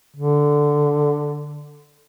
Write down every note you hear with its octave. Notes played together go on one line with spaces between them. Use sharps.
D3